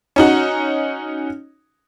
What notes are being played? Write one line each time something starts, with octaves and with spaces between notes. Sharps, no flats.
C#4 D#4 F#4